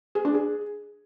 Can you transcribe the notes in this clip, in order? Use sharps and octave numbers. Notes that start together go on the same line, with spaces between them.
G#4
D4
G#4